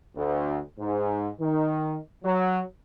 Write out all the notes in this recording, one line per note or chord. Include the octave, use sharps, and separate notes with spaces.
D2
G#2
D#3
F#3